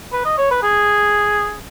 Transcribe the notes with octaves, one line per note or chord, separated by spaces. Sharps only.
B4
D#5
C#5
B4
G#4